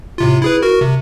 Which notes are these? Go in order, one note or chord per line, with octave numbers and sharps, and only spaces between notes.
A2 C3 F4
E4 G#4 B4
F#4 A#4
C3